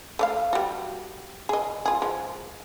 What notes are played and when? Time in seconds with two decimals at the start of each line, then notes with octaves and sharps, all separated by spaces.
0.19 A3 D5 F5
0.53 G3 F#4
1.49 G#4 D#5
1.86 F4 G#4
2.02 F3 G#3